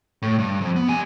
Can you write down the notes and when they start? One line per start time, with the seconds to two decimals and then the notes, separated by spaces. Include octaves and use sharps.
0.22 A2
0.38 G2
0.61 F2
0.76 B3
0.88 G3 G#5